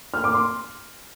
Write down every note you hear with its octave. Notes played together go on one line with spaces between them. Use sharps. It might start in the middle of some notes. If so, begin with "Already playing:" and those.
F6
D6
C6